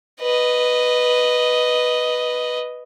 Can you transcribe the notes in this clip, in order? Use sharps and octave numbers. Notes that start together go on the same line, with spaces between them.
B4 D#5